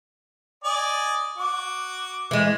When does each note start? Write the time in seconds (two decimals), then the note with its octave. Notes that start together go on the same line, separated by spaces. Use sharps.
0.64 D5 D#5 G#5
1.38 F#4 D6
2.31 E3 G#3